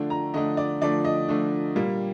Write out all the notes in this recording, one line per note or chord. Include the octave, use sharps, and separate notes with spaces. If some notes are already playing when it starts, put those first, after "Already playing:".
Already playing: D3 F3 A3 D4
A#5
D3 F3 A3 D4 D#5
D5
D3 F3 A3 D4 D5
D#5
D3 F3 A3 D4
A#2 G3 A#3